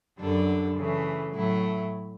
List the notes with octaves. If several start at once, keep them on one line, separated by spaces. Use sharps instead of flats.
F#2 D3 G3 D4 A4
C#3 E3 A3
A2 F#3 A3 E4